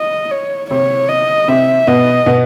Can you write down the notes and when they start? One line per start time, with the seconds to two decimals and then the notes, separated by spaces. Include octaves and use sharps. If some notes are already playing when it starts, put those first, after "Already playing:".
Already playing: D#5
0.31 C#5
0.70 C3 C4 C#5
1.09 D#5
1.48 C3 C4 E5
1.87 B2 B3 D#5
2.26 B2 B3